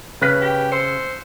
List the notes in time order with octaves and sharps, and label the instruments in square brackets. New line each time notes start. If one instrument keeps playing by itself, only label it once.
[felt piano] C#3 F#6 B6 [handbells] B4 C#5 F6
[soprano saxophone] G4
[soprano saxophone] C5 [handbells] C6 E6 C#7